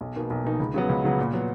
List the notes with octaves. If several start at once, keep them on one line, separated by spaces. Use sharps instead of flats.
B1
B2 A#3 D#4
B1
B2 A#3 D#4
C#2
C#3 F#3 B3
C#2
C#3 F#3 B3
A#2
F#3 B3